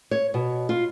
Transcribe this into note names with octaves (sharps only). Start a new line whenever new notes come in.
C#5
B2
F4